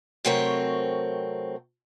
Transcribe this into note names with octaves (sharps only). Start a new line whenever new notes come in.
C3 F#3 A3 C4 A#4 C#5